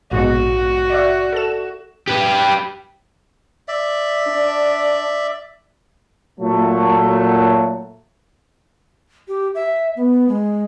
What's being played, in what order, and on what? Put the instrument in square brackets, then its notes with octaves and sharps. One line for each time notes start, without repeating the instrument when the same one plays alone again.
[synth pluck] A#1 G#2 B2 [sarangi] F#4
[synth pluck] D5 E5
A4 E7
[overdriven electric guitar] G4 B4
[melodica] D5 E5
[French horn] D4
[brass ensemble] A#2 F#3 A3
[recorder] G4
E5
B3
G#3